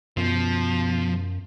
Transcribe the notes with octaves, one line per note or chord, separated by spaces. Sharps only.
F#2 B2 F3